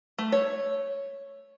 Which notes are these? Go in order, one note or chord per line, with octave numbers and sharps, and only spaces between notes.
A3
C#5